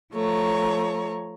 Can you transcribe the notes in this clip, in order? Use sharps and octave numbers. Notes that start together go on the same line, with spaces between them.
F3 A3 C#5 A#5